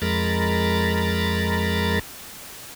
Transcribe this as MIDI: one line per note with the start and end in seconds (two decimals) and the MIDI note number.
0.02 1.99 41
0.02 1.99 56
0.02 1.99 70
0.02 1.99 82
0.02 1.99 83
0.02 1.99 93